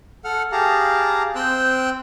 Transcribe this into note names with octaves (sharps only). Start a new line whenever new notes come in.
A4 F#5 F6
G4 G#4 F5 A5 A#5
C4 C5 G5 E6 F#6